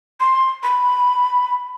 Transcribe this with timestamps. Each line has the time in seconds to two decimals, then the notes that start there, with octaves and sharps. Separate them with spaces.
0.20 C6
0.63 B5